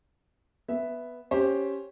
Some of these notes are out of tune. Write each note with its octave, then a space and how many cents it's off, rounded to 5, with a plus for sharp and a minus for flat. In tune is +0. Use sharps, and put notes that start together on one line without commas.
B3 +0 E5 +0
C#4 +0 G4 +0 C5 +10